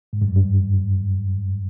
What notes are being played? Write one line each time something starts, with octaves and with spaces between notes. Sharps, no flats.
G#2
G2
F#2
G2